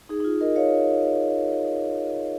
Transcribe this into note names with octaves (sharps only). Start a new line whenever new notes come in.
D#4 G#4
D#4
F4
A#4 D#5
C#5 F5